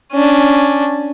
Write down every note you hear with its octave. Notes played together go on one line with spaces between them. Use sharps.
C#4 D4